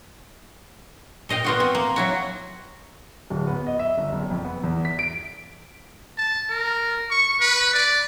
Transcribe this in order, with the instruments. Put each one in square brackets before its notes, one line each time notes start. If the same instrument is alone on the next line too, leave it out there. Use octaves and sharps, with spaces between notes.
[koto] A#2 D#5 F5 G5
B3 F4 F#4
C4
A#3
F#3 E4 F#4
[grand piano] D1
B3
D#5
E5
G1
F#1
F2
B3
E2
B6
D7
[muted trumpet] A5
A#4
C#6
B4
D5